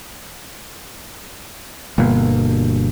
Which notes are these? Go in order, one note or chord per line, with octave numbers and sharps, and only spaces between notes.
G1 B2 A#3